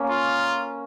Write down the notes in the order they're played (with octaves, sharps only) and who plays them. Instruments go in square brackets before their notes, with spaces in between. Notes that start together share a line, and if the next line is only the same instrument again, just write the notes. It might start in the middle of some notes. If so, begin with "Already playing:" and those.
Already playing: [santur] A#3 C#4
[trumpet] F4